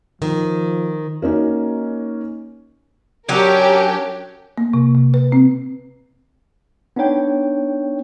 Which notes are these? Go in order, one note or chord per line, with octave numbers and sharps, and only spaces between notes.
D#3 F3
A#3 C#4 D#4 F#4
F#3 C#4 D4 G4 A#4
A#3
C3
C3
B4
C4
B3 D4 D#4 C#5 G5